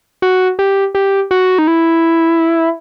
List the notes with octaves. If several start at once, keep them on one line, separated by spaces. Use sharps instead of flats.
F#4
G4
G4
F#4
D#4
E4